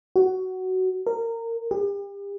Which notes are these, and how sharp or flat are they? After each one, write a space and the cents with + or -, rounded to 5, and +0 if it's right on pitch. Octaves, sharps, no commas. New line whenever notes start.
F#4 +15
A#4 -20
G4 +40